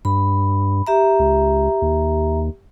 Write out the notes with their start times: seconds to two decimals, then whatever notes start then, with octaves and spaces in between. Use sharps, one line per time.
0.05 G2 B5
0.87 G4 E5 A#5
1.19 C#2
1.82 D#2